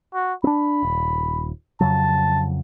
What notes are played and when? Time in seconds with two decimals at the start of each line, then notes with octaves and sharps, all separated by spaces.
0.14 F#4
0.44 C4 D4 B5
0.83 D#1
1.81 F2 C#3 F#3 A5